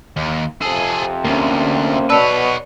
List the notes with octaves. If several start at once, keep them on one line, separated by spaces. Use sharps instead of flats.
D#2
F2 C3 G#4 A4
D2 A#3 C#4
B2 B4 C#5 D5 A5 E6